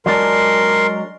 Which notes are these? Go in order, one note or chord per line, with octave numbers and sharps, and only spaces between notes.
F#3 G#3 D4 A#4 C6